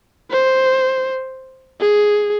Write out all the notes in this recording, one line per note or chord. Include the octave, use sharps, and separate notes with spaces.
C5
G#4